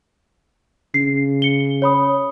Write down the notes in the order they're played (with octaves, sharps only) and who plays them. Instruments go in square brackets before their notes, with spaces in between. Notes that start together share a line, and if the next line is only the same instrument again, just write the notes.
[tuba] C#3 [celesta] C7
[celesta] C#7 G7
C#5 B5 D#6